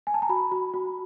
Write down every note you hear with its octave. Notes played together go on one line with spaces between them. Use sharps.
G#5
A5
A#5
F#4 B5
F#4
F#4